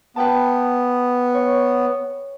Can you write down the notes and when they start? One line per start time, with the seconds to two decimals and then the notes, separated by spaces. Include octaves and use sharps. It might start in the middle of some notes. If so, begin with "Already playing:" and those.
0.16 B3 B4 G5 A5
1.34 C#5